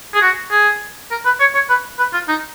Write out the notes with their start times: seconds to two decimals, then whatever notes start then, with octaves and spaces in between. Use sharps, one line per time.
0.14 G#4
0.21 F#4
0.51 G#4
1.11 A#4
1.25 B4
1.40 C#5
1.54 C#5
1.69 B4
1.99 B4
2.13 F4
2.28 D#4